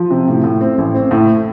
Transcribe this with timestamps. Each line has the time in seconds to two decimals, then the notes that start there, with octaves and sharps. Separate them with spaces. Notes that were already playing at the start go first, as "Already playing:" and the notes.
Already playing: F3
0.10 C3
0.28 A2
0.44 A2
0.61 C4
0.78 A1
0.94 C4
1.11 A2